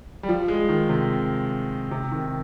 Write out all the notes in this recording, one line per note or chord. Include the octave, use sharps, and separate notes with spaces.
G3
F3
G#3
D#3
C3
C3
D#3